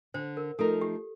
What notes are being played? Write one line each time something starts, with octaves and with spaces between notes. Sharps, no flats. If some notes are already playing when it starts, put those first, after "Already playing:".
D3 C5
A#4
F3 A3 D#4 A4 A#4
G4